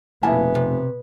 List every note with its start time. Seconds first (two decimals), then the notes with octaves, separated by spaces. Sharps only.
0.23 F1 B2 A#3 B3 E4 E5 G#5 A5
0.55 C3